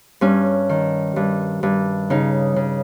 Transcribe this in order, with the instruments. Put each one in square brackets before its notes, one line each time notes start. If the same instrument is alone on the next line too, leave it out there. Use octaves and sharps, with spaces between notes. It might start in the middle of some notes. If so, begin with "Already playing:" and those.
[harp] G2 C#4
D#3
G2
G2
C#3 D#4
C#3